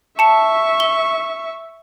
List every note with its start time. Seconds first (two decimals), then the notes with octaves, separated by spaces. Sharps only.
0.19 E5 A5 C#6 C#7
0.80 G7